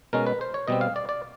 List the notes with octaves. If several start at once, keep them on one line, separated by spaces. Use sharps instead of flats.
B2 G#3 C#4 A#4
B4
C5
C#5
B2 G3 C4 D#5
F5
D5
D5